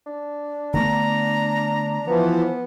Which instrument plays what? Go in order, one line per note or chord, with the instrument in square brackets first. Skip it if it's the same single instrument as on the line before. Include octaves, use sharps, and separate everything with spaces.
[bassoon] D4
[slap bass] D3 A3 B3 [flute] A#5
[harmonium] E3 F3 [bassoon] B3